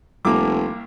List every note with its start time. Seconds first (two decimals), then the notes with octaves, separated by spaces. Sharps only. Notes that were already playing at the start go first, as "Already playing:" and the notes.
0.25 F1 C2 A#3 D6